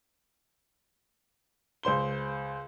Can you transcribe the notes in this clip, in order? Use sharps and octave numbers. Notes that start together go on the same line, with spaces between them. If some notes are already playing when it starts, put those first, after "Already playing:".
C#2 C5 C6 G7